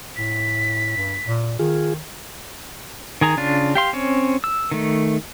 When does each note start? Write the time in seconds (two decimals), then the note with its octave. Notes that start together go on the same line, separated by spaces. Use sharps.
0.16 A2 B6
0.96 G2
1.26 A#2
1.59 D#3 F4 G#4
3.21 D#3 G#4 A#5
3.37 C#3 D4 F4
3.75 G4 F5 C6
3.93 C4 C#4 C#5
4.44 E6
4.71 D#3 A3